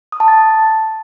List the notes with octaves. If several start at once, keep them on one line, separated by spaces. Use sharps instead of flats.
D#6
A5
A6